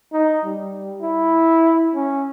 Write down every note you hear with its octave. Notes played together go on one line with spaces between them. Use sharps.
D#4
G3
E4
C#4